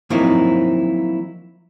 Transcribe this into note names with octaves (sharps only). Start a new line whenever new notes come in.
F3 F#3 A#3 C4 D#4 E4